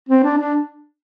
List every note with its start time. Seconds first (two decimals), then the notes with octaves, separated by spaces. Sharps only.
0.09 C4
0.23 D4
0.38 D4